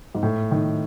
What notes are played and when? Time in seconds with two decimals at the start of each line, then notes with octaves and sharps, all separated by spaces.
0.15 G#2
0.23 A2
0.51 D#3